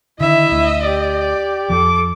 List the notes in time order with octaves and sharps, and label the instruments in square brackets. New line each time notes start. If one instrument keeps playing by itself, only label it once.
[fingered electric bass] D3 D#3 [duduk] E4 [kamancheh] D#5 [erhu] E5
[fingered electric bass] D2
[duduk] G4 [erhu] D5
[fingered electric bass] F2 F3 [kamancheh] A4 D6